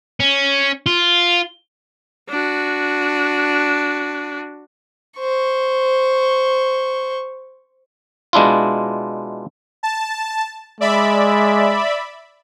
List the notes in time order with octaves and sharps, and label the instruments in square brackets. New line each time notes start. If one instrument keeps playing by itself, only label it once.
[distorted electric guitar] C#4
F4
[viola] D4 F#4
[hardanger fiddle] C5 C#6
[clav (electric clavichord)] B2 G#3 D4 E4 F4
[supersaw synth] A5
[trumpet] G#3 [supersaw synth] D5 E5 B5